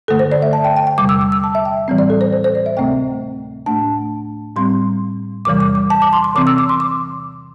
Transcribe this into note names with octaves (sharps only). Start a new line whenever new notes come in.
G2 D3 A3 A4
C5
D5
E5
A5
G5
G5
G5
E2 C3 G3 D6
E6
D6
E6
A5
E5
G5
A2 E3 G3 C4
D5
A4
C5
C5
C5
D5
E5
D2 C3 A3 C4 G5
A2 A3 D4 A5
A2 G3 C4 C6
E2 C3 E3 G3 D6
D6
D6
A5
D6
C6
C6
C3 E3 C4 D6
E6
D6
C6
D6